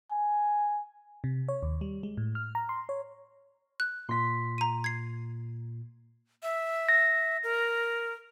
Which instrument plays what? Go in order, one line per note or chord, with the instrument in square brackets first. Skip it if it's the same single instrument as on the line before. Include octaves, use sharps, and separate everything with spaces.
[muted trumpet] G#5
[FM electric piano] C3
C#5
D#2
G3
G#3
A2
F6
A#5
C6
C#5
[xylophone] F#6
[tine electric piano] A#2 [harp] C6 B6
[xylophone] A#5 D#7
G#6 C7
[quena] E5
[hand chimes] A#6
[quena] A#4